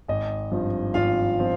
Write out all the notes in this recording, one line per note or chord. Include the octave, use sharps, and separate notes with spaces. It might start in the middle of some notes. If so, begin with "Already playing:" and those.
G#1 D#5
G2 F3 C4
G#1 F4 F5
F3 C4